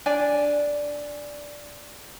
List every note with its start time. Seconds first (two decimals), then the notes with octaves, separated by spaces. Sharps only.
0.06 D4 D5 G#5